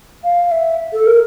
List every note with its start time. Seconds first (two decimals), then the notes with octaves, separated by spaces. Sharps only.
0.24 F5
0.52 E5
0.93 A4
1.06 A#4